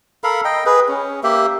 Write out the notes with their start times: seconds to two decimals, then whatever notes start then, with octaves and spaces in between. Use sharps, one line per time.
0.24 A4 A#4 F5 B5
0.45 D#5 G5
0.66 G#4 B4
0.88 C#4
1.23 A#3 G4 E5